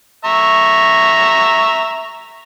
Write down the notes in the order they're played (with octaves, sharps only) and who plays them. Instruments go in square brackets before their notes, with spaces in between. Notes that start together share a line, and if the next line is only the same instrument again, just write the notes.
[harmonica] E5 A#5 C#6